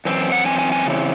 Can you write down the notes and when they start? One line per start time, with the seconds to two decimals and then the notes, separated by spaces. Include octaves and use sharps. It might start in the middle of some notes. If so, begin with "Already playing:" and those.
0.05 F#2 E3 C4
0.32 F#5
0.45 F#2 E3 C4 G#5
0.59 G#5
0.72 G#5
0.86 C#3 E3 C4